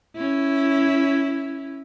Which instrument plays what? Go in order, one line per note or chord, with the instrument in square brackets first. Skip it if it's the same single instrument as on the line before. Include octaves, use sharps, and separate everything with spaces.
[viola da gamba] C#4 E4